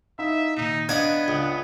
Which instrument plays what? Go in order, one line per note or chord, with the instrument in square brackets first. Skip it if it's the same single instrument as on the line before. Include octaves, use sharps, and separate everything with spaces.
[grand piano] D#4 E4 F5 [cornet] E5
[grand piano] A#2 D#3 [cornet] D#4
[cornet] B3 [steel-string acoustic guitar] D4 [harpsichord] D#5 F5 G#5 [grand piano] G#6
[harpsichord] C#2